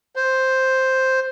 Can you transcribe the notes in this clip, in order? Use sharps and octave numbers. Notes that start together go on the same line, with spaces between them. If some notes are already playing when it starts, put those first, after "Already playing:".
C5